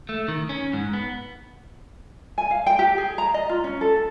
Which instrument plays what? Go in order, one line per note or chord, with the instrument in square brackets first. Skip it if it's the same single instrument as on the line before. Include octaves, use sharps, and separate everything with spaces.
[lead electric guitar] A3
D#3
C#4
G#2
B3
[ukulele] G#5
F5
G5
G4
G#4
A#5
D#5
F4
C#4
A4
A4